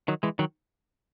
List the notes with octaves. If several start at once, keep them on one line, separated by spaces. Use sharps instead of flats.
D#3 F#3
E3 G#3
D#3 F#3